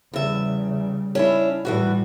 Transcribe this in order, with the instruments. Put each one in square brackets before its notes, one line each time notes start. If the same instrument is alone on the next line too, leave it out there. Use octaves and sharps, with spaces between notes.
[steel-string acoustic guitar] E2 E5 [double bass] C#3 G3
[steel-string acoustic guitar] C#4 D4 E4
[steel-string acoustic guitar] E2 E3 F#4 [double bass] A2 G3